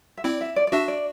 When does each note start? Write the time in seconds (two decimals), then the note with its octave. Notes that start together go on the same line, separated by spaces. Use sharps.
0.17 E5
0.24 C4 E4 D5
0.41 E5
0.56 D5
0.67 D5
0.72 D4 F#4 E5
0.88 D5